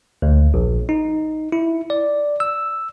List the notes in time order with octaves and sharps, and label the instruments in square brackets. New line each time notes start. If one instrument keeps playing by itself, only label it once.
[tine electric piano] D2
A#1
D#4
E4
D5
E6